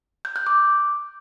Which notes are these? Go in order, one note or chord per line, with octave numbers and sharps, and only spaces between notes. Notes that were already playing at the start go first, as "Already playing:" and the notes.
G6
F#6
D6